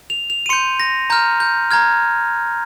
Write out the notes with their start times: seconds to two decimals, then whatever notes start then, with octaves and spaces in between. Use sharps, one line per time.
0.10 F7
0.30 F7
0.46 D#7
0.49 C6 G6 C#7
0.80 A#6
1.10 A#5 F6 G6
1.40 G6
1.71 A#5 F6 G#6